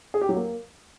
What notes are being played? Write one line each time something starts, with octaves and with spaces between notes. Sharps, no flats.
G#4
G4
F#3
A#3